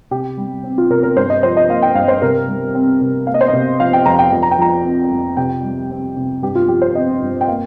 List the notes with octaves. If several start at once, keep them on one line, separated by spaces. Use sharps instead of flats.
C3 G4
G3
C4
F4
C3 A#4
A#4
G2 C5
D#5
F3 C5
D#5
A#3 F5
G5
G2 F5
C5
C3 A#4
G3
C4
C3
A#3 F5
D#5
C5
D#5
C3
F3 F5
G5
F2 A#5
G5
F2
A#5
G5
F3 A#5
C4
F2
C3 G5
G3
C4
C3
G2 G4
F4
F3 G4
C5
C4 D#5
G2
G5
A#3 F5